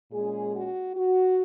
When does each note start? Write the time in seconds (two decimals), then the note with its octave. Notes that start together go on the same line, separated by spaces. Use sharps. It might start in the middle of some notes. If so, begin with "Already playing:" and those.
0.11 A#2 G#3 C#4 G#4
0.53 F#4
0.94 F#4